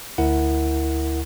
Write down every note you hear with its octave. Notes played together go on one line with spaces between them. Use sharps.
D2 E4 A#4 F#5